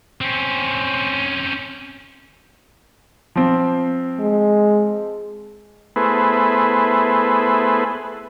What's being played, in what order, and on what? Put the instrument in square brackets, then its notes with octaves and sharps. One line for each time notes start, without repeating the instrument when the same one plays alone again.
[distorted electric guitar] C4 C#4
[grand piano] F3 C4
[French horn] G#3
[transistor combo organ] A3 B3 E4 G#4 B4 C5